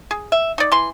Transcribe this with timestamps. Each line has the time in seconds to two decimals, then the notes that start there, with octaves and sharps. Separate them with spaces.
0.11 G#4
0.32 E5
0.58 D#4 D5
0.72 E3 C6